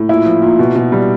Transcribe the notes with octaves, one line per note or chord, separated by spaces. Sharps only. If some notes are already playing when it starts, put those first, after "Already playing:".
Already playing: A2
A#2 E4
F3
A#2
B2
B2
G3